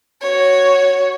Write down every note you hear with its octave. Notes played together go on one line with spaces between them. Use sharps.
F#4 C#5